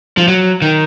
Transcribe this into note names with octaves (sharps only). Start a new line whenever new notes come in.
F3
F#3
D#3